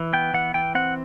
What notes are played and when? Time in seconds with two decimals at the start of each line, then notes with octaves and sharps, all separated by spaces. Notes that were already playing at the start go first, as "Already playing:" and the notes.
Already playing: E3
0.13 B3 G5
0.34 E3 F#5
0.54 E3 G5
0.75 C4 F#5